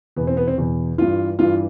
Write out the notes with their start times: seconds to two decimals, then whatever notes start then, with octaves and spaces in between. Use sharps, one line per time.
0.16 E2 B2 B3
0.27 C4
0.37 B3
0.48 C4
0.58 E2 B2
0.98 G2 E3 F4
1.39 G2 E3 F4